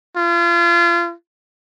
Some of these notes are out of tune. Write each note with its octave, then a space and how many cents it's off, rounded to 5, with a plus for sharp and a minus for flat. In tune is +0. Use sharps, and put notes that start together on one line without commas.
F4 -35